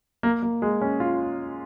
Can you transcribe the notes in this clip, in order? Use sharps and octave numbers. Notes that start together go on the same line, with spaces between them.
A#3
A#3
G#3
C#4
F4